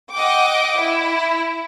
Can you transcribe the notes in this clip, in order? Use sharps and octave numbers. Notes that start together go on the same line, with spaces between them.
D#5 F#5 G5 D6
E4